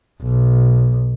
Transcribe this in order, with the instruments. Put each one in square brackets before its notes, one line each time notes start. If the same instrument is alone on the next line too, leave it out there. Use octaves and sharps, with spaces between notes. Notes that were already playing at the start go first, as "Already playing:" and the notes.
[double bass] B1